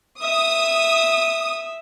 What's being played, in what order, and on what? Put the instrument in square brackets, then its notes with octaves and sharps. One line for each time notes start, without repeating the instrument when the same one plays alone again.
[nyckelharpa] E5 [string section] D#6